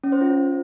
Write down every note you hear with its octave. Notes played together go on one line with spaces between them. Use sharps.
C#4
C5
F4